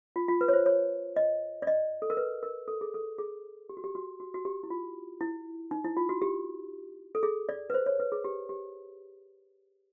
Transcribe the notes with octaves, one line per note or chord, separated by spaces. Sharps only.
F4
F4
B4
C#5
C5
C#5
D#5
D5
D#5
A4
A#4
B4
A#4
A4
G#4
A4
G#4
G4
F#4
G4
F#4
F#4
F#4
G4
E4
F4
E4
D#4
E4
F4
F#4
G4
A4
G#4
D5
B4
C5
C#5
B4
G#4
G4
G4